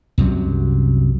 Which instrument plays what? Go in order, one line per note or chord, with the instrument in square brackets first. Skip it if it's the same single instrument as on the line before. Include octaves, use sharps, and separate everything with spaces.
[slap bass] C2 F#2 C3 F#3